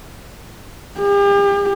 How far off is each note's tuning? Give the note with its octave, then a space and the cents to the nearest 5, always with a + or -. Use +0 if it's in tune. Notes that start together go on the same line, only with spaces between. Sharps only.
G4 +40